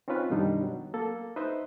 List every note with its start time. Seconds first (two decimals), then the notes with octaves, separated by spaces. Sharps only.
0.08 C4 C#4 D#4 F4 B4
0.30 F#2 B2 D#3 G3 D4 D#4
0.63 F#3
0.94 A#3 A4
1.36 D#4 B4 C5 D#5 E5